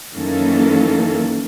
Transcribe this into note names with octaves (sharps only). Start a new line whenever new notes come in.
F#2 D#3 E3 A#3 C#4 A4